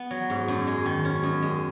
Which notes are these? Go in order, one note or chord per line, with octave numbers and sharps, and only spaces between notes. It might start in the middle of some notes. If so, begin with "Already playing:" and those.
Already playing: B3
F#3
G#2
F#2
G#3
D#3
C#4
F#2
G#3